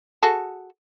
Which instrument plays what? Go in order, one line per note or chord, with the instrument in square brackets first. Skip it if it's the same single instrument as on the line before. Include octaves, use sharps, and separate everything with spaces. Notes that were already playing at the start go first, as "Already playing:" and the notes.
[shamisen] F#4 G#4 A4